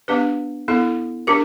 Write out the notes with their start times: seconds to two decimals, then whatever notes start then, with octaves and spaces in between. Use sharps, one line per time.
0.08 B3 D4 G4 B4
0.68 B3 E4 A4
1.27 D4 G4 A#4